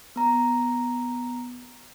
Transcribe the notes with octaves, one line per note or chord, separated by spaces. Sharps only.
B3 A#5